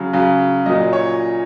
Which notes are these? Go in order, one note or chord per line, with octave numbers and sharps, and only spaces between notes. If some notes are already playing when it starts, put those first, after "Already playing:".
Already playing: C#3 F#3
C#3 F#3
A#2 F#3 D#5
C#5